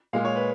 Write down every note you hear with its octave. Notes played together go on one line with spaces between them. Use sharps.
A#2 G#3 F5
C#5
B4